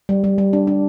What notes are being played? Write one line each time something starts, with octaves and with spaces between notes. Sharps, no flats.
G3
G3
G3
D4
D4